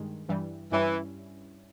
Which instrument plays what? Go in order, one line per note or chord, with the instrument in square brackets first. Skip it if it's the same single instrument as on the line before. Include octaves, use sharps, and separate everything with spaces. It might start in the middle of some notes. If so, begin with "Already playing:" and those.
Already playing: [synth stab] G2 D#3 G#3
G2 E3 G3
[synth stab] G2 G3 C#4 E4 [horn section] E3